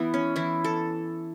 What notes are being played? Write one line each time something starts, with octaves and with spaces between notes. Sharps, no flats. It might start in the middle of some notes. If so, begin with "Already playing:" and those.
Already playing: E3 B3 E4
C#4
E3 E4
A4